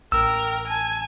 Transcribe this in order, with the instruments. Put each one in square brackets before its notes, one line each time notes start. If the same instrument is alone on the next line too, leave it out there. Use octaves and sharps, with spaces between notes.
[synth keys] A1 [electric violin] A#4 [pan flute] G5 [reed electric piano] E6
[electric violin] G#5 [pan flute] A5